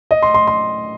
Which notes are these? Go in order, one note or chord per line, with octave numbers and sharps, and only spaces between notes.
D#5
C6
C6
C6